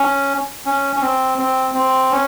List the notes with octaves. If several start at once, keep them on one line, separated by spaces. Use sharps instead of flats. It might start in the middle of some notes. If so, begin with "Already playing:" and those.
Already playing: C#4
C#4
C#4
C4
C4
C4
C#4